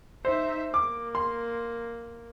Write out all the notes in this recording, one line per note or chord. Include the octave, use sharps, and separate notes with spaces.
D#4 C5 E5
A#3 D6
C6